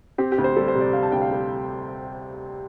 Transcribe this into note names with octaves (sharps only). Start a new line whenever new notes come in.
C4 G4
G4
D2
C5
G3 A4
C5
C3
D5
C4 F5
A5
D2 G5
F5
G3